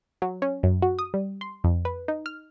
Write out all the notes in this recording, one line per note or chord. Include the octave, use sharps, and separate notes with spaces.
F#3
C#4
F#2
F#4
D#6
G3
C6
F2
B4
D#4
F6